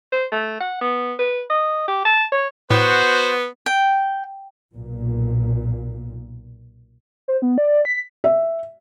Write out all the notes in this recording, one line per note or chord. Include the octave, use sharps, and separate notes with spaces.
C5
A3
F#5
B3
B4
D#5
G4
A5
C#5
A2 B3 F#4 C5
G5
B1 A#2
C5
B3
D5
B6
E5